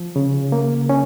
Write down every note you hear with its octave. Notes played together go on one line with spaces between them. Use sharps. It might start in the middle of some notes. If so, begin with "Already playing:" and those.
Already playing: F3
C#3
A#3
C#4